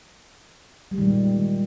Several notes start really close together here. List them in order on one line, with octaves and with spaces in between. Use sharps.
G3 G#3 D#3 A#2